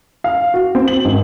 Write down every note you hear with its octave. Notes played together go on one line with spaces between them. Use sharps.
F5
F#4
C4
F#7
G#1